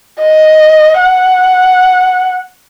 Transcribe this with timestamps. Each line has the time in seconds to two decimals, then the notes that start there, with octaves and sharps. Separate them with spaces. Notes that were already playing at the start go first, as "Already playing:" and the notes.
0.21 D#5
1.01 F#5